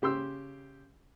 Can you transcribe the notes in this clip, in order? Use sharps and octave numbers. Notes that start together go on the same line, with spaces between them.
C#3 G4 C6 E6